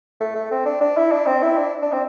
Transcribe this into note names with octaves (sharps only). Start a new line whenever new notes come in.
A3
A3
C4
D4
D4
E4
D4
C4
E4
D4
D4
C4